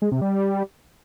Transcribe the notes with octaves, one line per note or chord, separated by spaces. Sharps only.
G#3
C3
G3